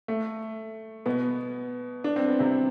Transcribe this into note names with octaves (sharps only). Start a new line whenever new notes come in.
A3
B2 B3
D4
C4
B3
C3 C4